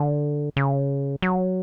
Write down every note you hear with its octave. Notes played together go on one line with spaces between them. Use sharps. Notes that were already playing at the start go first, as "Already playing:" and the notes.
Already playing: D3
C#3
F#3